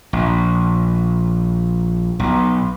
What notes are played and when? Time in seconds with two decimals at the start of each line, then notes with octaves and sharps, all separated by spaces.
0.13 A#1
2.20 B1